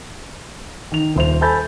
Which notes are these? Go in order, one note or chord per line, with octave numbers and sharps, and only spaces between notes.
D#3 F7
D#1 C5 F7
A4 C5 G#5 B5 G6 A6